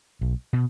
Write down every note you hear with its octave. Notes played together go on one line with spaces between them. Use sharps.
B1
B2